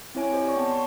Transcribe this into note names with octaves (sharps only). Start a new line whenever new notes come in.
C4 E4 C#5 G#5 D7
G4 C5 D#5
C#5 D5 C#6
B3 G5 A5
C6 C#6